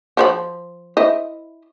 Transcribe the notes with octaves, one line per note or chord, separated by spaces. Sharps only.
F3 C5 B5
E4 C5 D#5